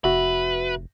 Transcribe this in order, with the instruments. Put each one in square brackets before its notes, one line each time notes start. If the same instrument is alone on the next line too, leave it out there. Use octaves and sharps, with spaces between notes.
[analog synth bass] F1 [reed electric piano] F#4 E5 [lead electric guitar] B4